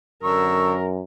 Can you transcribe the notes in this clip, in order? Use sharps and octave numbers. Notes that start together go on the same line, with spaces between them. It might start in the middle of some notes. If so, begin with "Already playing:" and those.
F#2 D3 A#4 C#6 E6